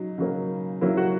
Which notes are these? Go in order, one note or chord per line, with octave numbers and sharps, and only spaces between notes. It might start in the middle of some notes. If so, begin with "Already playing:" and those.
Already playing: C#3 F#3 D#4
C#3 F#3 A#3
C#3 F#3 A#3 E4
F#4